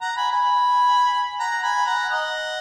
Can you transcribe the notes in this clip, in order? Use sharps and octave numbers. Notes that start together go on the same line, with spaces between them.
F#5 A#5
G#5 B5
G#5 B5
F#5 A#5
G#5 B5
F#5 A#5
D#5 F#5